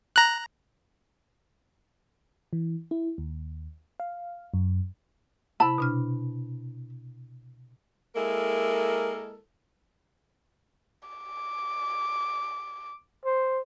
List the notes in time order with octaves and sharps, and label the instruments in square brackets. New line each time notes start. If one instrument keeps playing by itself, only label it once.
[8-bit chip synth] A#5 F#6
[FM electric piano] E3
E4
D#2
F5
F#2
[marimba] C3 E4 [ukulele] A5 B5
[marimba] B2 D4 F6
[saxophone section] G#3 A#3 E4 A4 A#4
[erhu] D6
[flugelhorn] C5